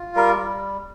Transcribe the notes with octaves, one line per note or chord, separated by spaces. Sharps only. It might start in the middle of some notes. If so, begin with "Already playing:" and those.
Already playing: F4
G3 A#4
G3